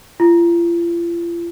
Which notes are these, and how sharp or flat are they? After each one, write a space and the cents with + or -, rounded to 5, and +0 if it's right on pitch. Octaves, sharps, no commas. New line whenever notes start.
F4 -40